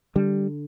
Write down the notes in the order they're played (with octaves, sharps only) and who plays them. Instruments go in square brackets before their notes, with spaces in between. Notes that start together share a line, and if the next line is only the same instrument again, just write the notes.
[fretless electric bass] D3 G3